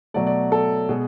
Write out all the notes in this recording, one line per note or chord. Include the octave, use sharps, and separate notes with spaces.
B2 F#3 A3 D5
D5
A4
B2 G#3 G#4